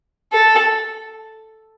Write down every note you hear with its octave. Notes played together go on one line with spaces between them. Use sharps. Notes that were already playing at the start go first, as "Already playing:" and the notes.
A4